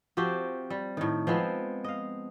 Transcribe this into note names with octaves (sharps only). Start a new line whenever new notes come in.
F3 C4 F#4 G4
G3
A2 D#3
F3 G#3 B3 C4
D#5 F5